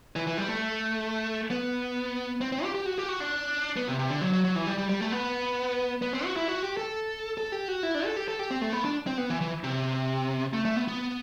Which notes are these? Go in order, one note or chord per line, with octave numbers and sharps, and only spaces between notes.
E3
E3
G3
A3
B3
C4
C4
G4
G4
F#4
G4
F#4
D4
B3
C3
C3
D3
F#3
F#3
F#3
E3
G3
G3
G3
A3
B3
B3
C4
F#4
E4
F#4
G4
A4
A4
G4
F#4
E4
D4
A4
G4
A4
G4
C4
A3
B3
D4
C4
B3
E3
E3
C3
A3
A3
B3
B3